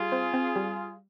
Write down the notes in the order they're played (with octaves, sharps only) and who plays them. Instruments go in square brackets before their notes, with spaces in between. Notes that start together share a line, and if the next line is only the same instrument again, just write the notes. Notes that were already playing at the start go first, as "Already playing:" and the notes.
Already playing: [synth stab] G3 [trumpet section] F4 G#4
[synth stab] C4
C4
G3